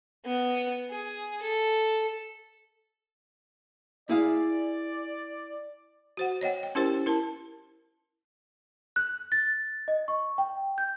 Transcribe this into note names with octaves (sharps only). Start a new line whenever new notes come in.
B3
G#4
A4
E4 G#4 D5 F5
F#4 C5 F#5
C#5 D#5 F#5 G5
G5
C#4 E4 G4 A#4 C5
E4 A#4 A5
F#6
A6
D#5
C#6
G5
G6